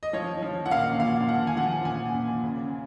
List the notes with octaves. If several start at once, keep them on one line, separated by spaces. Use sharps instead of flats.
D#5
F3 C#5
F3
F#5
A#2 F5
A#2 F5
F3 F#5
G#5
F3 F#5
A#2 G#5
A#2
C#3